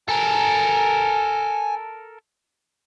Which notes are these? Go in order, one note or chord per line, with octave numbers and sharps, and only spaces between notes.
A4 A#4 G#5